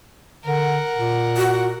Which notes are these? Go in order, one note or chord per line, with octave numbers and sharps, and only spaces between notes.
D3 A#4 F#5
A#2
F#4